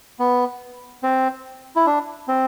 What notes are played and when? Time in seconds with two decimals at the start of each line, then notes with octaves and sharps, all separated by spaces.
0.19 B3
1.03 C4
1.76 E4
1.86 D4
2.28 C4